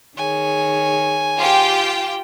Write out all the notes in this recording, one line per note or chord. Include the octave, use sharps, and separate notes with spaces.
D#3 G#4 C#5 G#5
F4 G4 G5